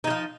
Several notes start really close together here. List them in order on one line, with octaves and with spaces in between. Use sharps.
D#4 F#3 F3